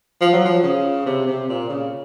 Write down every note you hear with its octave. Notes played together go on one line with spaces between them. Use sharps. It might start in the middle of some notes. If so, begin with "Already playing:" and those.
F3
F#3
F3
C#3
C3
C3
A#2
C#3